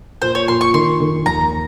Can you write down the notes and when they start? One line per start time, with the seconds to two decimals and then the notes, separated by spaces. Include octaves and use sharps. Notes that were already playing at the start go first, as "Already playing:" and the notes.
0.22 A#2 C5
0.35 C#5
0.48 A#2 C6
0.61 C#6
0.74 D#3 C6
1.00 D#3
1.26 D#2 A#5